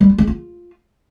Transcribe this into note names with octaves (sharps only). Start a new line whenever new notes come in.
G3
F4
G#3
F4